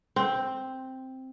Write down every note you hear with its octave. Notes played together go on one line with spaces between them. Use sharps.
C4